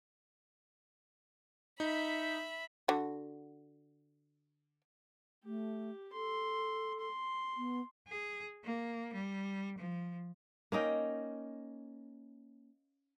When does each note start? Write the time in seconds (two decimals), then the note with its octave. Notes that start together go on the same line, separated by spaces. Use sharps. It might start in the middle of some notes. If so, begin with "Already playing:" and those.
1.80 D#4 E5 B5
2.88 D3 F#4
5.44 A3 G4
6.13 A4 C6
6.99 C6
7.57 B3
8.08 G#4
8.65 A#3
9.14 G3
9.78 F3
10.72 A#3 C#4 D#4 G5